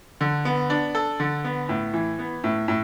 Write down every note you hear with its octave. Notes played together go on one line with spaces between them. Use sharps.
D3
B3
D4
A4
D3
B3
A2
E3
B3
A2
A2